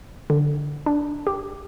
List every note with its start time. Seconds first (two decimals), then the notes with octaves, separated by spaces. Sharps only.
0.30 D3
0.86 D4
1.27 G4